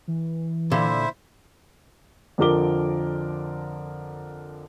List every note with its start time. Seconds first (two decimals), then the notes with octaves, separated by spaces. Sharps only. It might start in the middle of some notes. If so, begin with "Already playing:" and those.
0.08 E3
0.71 A#2 D3 E4 C5 E5
2.38 F2 D3 F3 A#4 D6 G7